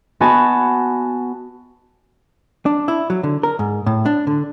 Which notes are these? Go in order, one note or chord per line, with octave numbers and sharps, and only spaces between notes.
B3 F#4 D#5 G#5 A5 B5
D4
E4
F#3
D3
A#4
G#2
A2
D4
D3